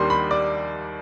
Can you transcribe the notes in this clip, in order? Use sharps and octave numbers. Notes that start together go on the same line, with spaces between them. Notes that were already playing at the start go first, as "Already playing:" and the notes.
Already playing: D#2 D#3 G3 D4 C6
B5
D5